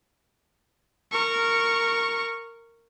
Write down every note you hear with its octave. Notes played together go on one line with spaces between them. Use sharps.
A#4 C#6